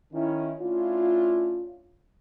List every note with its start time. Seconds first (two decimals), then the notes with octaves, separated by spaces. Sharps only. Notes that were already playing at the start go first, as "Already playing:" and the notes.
0.13 D#3 C#4 E4
0.60 A3 C#4 D4 E4 F4